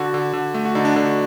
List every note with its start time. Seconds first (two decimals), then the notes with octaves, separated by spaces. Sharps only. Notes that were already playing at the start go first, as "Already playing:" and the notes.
Already playing: D3 F#4
0.14 D3
0.33 D3
0.54 A3
0.65 F#4
0.75 D3 D#4
0.85 D4
0.96 D3 D4
1.06 F#4